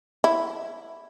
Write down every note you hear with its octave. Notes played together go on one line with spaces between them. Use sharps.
E4